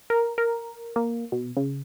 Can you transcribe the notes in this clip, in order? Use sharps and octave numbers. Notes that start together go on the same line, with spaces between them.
A#4
A#4
A#3
B2
C#3